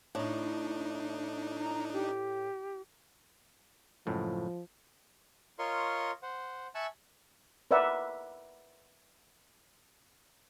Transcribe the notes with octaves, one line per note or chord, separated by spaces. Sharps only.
A2 D4 D#4
A#5
G4
C#2 F#2 A2 F3
F4 A#4 C#5 D#5 C6 C#6
C5 F#5
E5 G#5 A5 C#6 E6 F#6
A#4 B4 D5 E5 F#5